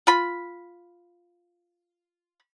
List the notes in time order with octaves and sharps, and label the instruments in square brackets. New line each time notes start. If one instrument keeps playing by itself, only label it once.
[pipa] F4 B5